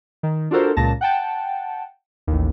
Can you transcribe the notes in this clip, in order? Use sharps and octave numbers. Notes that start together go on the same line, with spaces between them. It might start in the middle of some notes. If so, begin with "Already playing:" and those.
D#3
D4 F4 F#4 A4 A#4 C5
C#2 A#2 A5 A#6
F#5 G5 A5
A1 D#2